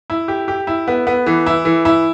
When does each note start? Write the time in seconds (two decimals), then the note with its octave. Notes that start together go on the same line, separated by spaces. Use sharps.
0.10 E4
0.28 G4
0.48 G4
0.67 E4
0.88 B3
1.07 B3
1.26 E3
1.46 E4
1.65 E3
1.85 E4